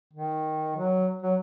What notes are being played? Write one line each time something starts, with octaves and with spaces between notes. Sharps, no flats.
D#3
F#3
F#3